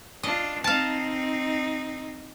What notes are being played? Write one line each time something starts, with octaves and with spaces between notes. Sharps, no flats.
D4 F4 D#5
C4 D#4 F5 A5